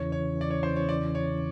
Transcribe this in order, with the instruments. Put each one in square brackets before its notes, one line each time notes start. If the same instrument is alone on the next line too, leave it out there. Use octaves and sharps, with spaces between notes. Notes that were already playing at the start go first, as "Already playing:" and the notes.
Already playing: [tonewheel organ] E2 C#3 E3 [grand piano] C#5
[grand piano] C#5
D5
C#5
C5
C#5
D5
C#5